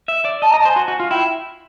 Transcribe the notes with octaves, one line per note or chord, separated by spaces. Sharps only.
E5
D5
D#5 A5
A#5
D#5
A5
C5 G#5
F#4
F#4
F4
E4 G5